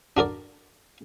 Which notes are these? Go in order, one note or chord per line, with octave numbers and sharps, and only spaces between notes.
D4 F#4 A#4 D5